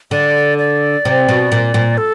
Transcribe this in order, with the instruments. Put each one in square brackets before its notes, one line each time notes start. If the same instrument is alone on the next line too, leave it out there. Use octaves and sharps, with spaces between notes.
[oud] D3 [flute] D5
[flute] D5
[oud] C3
B2
A#2
A#2
[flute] A4